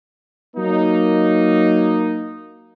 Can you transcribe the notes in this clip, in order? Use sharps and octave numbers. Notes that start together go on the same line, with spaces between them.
F#3 A#3 D#4